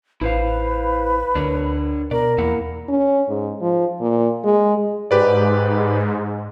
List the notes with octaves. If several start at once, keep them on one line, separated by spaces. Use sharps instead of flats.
A1 E4 B4 C5 F5
D2 D4 A#4 C#5
B2 A#4 D5
E2 A#3 E4 F#5
C#4
G#2
F3
A#2
G#3
G#2 G4 B4 D5